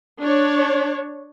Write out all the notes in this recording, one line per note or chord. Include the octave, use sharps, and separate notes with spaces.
D4 C#5